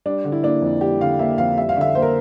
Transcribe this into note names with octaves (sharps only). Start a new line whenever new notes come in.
G3 D4
D3
E4
A#3 D4
F2
G3 G4
D3 F5
A#3 E5
F2 F5
G3 E5
F5
D3 E5
A#3 C5
A#4